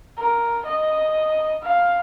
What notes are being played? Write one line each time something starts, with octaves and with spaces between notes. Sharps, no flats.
A#4
D#5
F5